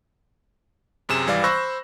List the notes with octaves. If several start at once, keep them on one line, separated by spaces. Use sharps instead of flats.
F#2 C3 G#4 E7
G#1 E3 G3 D5 F5
C5 B5 C#6 E6 F#6 A#6